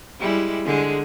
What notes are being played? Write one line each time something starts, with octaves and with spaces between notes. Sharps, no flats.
G3 G#3 E4
D3 G#3 G#4